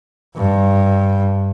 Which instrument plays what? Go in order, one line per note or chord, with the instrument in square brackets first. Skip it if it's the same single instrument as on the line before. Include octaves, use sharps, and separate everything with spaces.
[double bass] G2